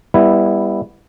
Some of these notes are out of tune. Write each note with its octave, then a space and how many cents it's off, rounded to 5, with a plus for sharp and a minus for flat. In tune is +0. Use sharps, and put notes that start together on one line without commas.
G3 +25 B3 -10 E4 +0